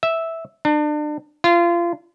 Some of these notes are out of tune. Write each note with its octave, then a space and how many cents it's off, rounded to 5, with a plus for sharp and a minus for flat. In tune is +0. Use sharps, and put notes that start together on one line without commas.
E5 -5
D4 +35
F4 -25